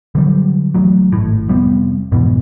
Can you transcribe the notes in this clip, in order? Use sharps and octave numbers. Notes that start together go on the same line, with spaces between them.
D3 F#3 G3
A1 A2 F#3
G#1 A2
F1 G3 B3 C4
F2 G#2 B2 E3